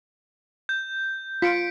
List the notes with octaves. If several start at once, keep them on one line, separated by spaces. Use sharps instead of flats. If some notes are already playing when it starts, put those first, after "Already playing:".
G6
F4 B6 C#7 D7